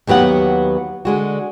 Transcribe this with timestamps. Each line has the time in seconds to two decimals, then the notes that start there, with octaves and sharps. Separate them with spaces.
0.07 D#2 F#3 B3 G4 F#5
1.05 D3 G#3 F#4